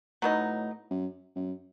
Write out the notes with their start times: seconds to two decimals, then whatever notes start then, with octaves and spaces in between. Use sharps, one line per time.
0.22 A2 F#3 B3 D#4
0.90 F#2
1.36 F#2